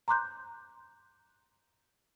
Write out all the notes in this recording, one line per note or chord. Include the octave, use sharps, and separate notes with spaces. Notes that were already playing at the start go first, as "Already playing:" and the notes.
A#5 C6 D6 F#6 G6